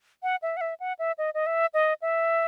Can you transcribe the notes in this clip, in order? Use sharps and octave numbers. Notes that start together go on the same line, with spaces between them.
F#5
E5
F#5
E5
F#5
E5
D#5
D#5
E5
D#5
E5